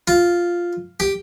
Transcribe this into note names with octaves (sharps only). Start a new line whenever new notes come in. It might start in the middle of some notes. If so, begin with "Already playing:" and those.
F4
G4